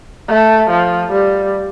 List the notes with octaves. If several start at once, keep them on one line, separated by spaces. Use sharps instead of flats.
A3
F3
G3